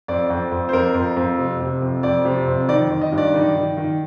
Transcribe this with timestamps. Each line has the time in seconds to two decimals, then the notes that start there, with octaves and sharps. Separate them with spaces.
0.08 F2 D5
0.30 F2
0.51 F2
0.69 C5
0.73 F2 A#4
0.94 F2
1.16 F2
1.38 C3
1.60 C3
1.82 F2
2.03 F2 D5
2.25 C3
2.47 F2
2.68 D#3 D5
2.91 D#3
3.01 D#5
3.12 G2
3.18 D5
3.34 D#3
3.56 D#3
3.77 D#3